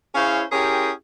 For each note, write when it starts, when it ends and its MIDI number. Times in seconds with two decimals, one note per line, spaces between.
0.14 0.43 61
0.14 0.43 64
0.14 0.43 68
0.14 0.43 72
0.14 0.43 73
0.14 0.43 77
0.52 0.92 61
0.52 0.92 64
0.52 0.92 67
0.52 0.92 68
0.52 0.92 70
0.52 0.92 79